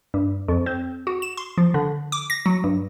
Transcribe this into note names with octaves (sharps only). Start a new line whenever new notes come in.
G2
F2
C4
F#4
E7
C6
F3
D3
D6
A#6
F#3
G2